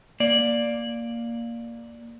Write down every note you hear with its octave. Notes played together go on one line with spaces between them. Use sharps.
A#3 D5